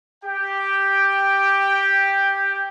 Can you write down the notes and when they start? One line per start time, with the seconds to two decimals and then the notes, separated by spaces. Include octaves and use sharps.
0.24 G4 G5